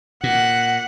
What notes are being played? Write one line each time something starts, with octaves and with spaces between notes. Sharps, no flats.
A#2 F#5